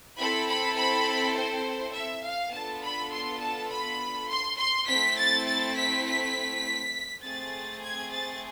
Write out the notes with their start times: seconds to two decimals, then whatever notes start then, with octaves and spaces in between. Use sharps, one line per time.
0.18 C4 E4 A4 B5
0.48 B5
0.77 B5
1.36 C5
1.94 E5
2.24 F5
2.53 B3 D4 F4 A4 A5
2.83 B5
3.13 C6
3.41 A5
3.71 B5
4.30 C6
4.58 C6
4.88 A3 C4 E4 B6
5.18 A6
5.47 A6
5.77 B6
6.06 B6
7.24 A3 C4 G#4 A6
7.83 G#6
8.11 A6